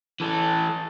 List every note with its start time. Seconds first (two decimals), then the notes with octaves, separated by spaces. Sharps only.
0.20 E3 A4